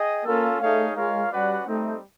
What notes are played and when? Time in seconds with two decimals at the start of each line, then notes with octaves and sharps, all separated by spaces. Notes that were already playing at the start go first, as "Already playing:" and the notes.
Already playing: G#4 D#5 G5
0.25 A#3 C#4 F4 A4
0.60 A3 D#4 G#4 C#5 F5
0.96 G#3 F4 A#4 C#5 F5
1.32 G3 C#4 F#4 B4 D5 F#5
1.67 G3 A3 C4 D#4